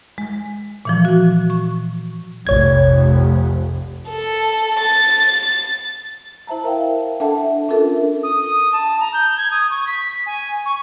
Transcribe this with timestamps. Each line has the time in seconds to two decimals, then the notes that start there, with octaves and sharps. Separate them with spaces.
0.18 G#3
0.85 A#2 E3 F3
1.05 F#4
1.50 C#6
2.47 F1 A#1 C#5 G#6
4.10 A4
4.80 A6
6.47 E4 C5 E5 A5 A#5
6.64 A#4 E5 F5 G5
7.20 D4 A4 E5 F#5 A5
7.68 C#4 D4 F4 A4 A#4 E5
8.23 D#6
8.44 D#6
8.72 A5
9.00 A#5
9.14 G6
9.37 G#6
9.51 D#6
9.70 C#6
9.87 B6
10.26 G#5
10.65 C#6